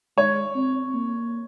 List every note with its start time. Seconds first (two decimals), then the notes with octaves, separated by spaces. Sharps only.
0.17 G#3 C#5
0.55 C4
0.94 A#3